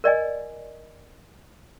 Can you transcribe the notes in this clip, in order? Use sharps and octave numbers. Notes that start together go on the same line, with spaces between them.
A#4 D5 D#5 G#5